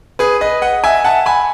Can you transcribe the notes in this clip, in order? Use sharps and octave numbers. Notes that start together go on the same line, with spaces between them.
G#4 B4
B4 D#5
D#5 F#5
E5 G#5
F#5 A5
G#5 B5